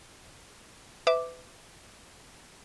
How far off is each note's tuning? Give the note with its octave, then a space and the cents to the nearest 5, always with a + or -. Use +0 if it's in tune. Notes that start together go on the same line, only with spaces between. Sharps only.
B4 +30 E5 -15 D6 +0